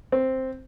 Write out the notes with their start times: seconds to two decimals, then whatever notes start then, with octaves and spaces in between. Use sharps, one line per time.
0.12 C4